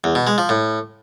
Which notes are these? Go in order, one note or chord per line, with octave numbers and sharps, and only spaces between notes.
E2
B2
G#3
F3
A2